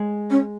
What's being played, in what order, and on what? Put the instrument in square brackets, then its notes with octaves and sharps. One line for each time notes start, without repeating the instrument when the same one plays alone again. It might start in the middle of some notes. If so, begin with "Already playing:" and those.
Already playing: [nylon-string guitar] G#3
[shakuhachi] C#4